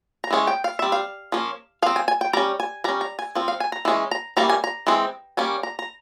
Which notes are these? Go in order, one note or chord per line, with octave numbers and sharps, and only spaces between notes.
A#5
E3 G#3 C#4
G5
F5
G3 C4 E5
F5
F3 A#3 C#4
F3 C4 F5
G#5
G#5
G5
G3 C#4 A#5
G#5
G3 C#4 A#5
A#5
G#5
F3 C4
F5
G#5
A#5
E3 G#3 C#4
A#5
E3 G3 A#3 C#4 A#5
G#5
A#5
E3 G#3 C4
G3 A#3 C#4 G#5
A#5
A#5